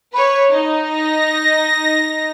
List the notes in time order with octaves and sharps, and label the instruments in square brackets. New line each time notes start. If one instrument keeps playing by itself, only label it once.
[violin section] B4 C#5
D#4
[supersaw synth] A#6